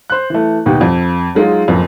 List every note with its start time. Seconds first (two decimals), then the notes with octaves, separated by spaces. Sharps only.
0.10 C5 F#6
0.30 E3 A3
0.66 D#2 B2 D#4 G4
0.81 F2
1.35 F#3 G#3 D#4 F4
1.68 F#1 F2